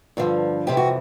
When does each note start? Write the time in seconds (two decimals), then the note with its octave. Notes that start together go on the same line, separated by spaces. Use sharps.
0.17 G2 D3 F3
0.67 F2 C3 E3 G4
0.77 F#4